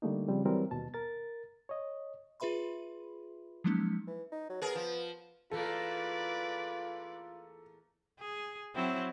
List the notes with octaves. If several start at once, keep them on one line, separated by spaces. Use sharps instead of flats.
D3 G3 A3 A#3 D#4
C#3 F3 G3 C4
E3 F#3 G3 C4 A#4
D#2 B2 A5
A#4 A6
C#5 D#5
F4 G#4 B4 E5 B5 C6
F3 F#3 G#3 A#3 C#4 D#4
E3
D#4
F#3
B3 G#4 A#4
F3
E2 A3 A#3 F4 A4 B4 D5
G#4
F#3 C4 E4